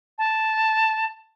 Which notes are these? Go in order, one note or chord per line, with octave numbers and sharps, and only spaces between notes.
A5